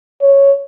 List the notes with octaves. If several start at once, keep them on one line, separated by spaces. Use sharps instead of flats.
C#5